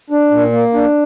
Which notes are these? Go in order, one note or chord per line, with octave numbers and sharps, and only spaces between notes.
D4
A#2
A#3
D4